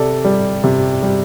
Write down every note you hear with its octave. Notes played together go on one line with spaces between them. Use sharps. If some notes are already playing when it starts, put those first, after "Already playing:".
Already playing: C3 A4 D5
G3
C3
G3